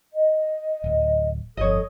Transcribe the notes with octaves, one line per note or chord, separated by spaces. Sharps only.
D#5
D1
G1 F2 A4 C#5 D#5 D#6